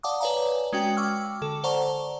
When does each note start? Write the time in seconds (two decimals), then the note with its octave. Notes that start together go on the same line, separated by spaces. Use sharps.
0.03 D5 F5 F#5 A5 D6 D#6
0.21 B4 C#5 D5 F5 G#5 A#5
0.73 G#3 C#4 F#4 G5
0.97 G5 C#6 D6 E6 F6
1.42 D3 A4
1.64 C5 D5 F#5 A5 A#5 C#6